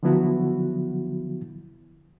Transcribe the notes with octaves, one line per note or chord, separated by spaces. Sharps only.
D3 F3 F#3 B3 E4 F#4